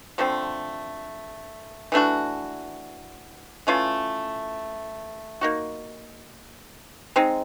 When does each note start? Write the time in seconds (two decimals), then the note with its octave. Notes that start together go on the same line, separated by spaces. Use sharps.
0.18 D3 F3 A3 C4
1.92 E3 A3 D4 F#4
3.67 E3 A3 C#4 F4
5.41 A#3 D#4 F#4
7.16 G#3 C4 D#4